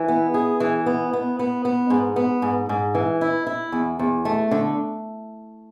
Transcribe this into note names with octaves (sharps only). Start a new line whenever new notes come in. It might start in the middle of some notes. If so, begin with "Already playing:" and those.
Already playing: E3
B3
G#4
E3
B3
B3
B3
B3
G#2
B3
G#2
G#2
E3
E4
E4
E2
E2
A3
D3